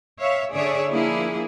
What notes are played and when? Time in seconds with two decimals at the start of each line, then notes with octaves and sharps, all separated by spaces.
0.20 C#5 E5 F5
0.54 D3 G#4 C#5 D5 E5
0.91 F3 A#3 D4 E4 G#4